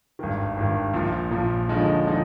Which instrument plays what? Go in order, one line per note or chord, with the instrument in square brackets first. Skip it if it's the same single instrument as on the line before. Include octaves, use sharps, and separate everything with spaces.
[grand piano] G#1 G2 D#3
G#1 G2 D#3
A#1 A#2 F3
A#1 A#2 F3
D#2 D3 F3 G#3 D#4
D3 F3 G#3 D#4